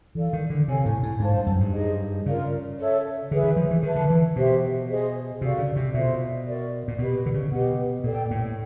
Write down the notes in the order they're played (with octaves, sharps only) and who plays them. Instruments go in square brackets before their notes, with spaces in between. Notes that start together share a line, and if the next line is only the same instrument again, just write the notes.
[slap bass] E3 [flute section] A4 D5 F5
[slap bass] D#3
D3
[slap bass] C3 [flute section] A4 C#5 F5 G#5
[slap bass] A2
A2
[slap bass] G#2 [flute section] C5 F5 A5
[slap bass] G2
F#2
G2
[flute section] D#4 G#4 C5 D#5
[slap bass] C#3 [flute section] F4 A#4 D5 F5
[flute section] A4 C#5 E5
[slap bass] D3 [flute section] G#4 B4 E5
[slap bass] D#3
F3
E3
[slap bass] D#3 [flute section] B4 E5 A5
[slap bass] D3
E3
[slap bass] B2 [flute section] G4 C5 E5
[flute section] G#4 C5 D#5
[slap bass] C3 [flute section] F#4 A4 D5 F5
[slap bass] C#3
C3
[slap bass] B2 [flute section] F4 A4 C5 E5
[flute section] F#4 A#4 D5
[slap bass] A#2
[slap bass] B2 [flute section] G4 B4 D#5
[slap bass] D3
C#3
[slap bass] B2 [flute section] G4 B4 D#5 F#5
[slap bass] A#2 [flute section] A4 D5 G5
[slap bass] A2